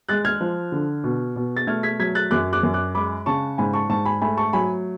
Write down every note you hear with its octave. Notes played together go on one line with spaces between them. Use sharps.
G#3 F#6 A6
F6 G#6
F3
D3
B2
B2
A6
A3 F6 G#6
G#6 B6
F#3 G#6 B6
F#6 A6
F#2 D6 F#6
D6 F#6
F#2
D6 F#6
G#3 B5 D6
C#3 A5 C#6
G#2 G#5 B5
A5 C#6
G#2 A5 C#6
G#5 B5
A3 G#5 B5
A5 C#6
F#3 G#5 B5